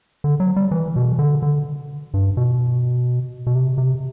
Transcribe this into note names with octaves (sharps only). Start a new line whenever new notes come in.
D3
F#3
G3
E3
B2
D3
D3
G2
B2
B2
C3
C3